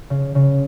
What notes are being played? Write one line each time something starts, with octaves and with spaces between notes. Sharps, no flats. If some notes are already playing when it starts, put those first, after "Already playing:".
C#3
C#3